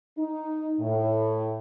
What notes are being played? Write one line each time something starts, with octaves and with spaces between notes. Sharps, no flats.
D#4
A2